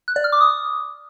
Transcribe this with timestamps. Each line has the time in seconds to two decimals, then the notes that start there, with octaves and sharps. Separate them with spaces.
0.08 F#6
0.16 D5
0.24 F6
0.32 D6
0.41 D#6